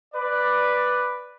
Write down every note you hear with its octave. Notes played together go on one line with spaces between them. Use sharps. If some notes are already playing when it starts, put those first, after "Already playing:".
B4 D5